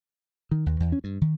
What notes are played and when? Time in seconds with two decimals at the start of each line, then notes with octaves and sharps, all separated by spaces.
0.51 D#3
0.66 D#2
0.80 E2
0.92 C#4
1.04 G2
1.21 D#3